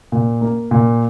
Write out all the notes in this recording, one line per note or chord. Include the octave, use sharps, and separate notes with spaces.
A#2
A#3
A#2